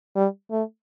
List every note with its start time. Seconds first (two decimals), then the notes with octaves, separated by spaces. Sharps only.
0.16 G3
0.51 A3